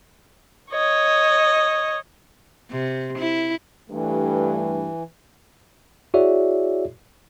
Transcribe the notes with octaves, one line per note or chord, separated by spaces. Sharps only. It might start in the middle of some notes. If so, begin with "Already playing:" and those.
C#5 D#5
C3
E4
G2 E3 A3
E4 F#4 G#4 C#5 D5 E5